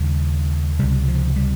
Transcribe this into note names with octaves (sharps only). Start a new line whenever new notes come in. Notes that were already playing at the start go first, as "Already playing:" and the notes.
Already playing: D#2 C#3 G3
C#2 C3 G3
F3
G3